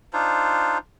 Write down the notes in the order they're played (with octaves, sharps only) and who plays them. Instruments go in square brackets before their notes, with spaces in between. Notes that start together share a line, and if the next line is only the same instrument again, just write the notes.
[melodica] D4 D#4 F4 C5